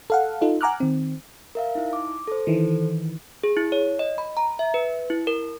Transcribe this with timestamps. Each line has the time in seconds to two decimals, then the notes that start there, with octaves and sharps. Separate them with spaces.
0.10 A4 F5 F#5
0.41 D#4 F4 A4
0.61 F#5 G#5 A#5 D6 F6 F#6
0.80 D#3 C4
1.55 A#4 E5 F5
1.75 D#4 E4
1.93 D6
2.28 A4 C5
2.47 D#3 E3
3.44 G#4
3.57 E4
3.72 C#5
3.99 D#5
4.18 B5
4.37 A#5
4.59 E5
4.74 B4
5.10 E4
5.27 A#4